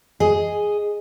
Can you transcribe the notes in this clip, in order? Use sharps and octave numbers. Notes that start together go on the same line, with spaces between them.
G#4 D#5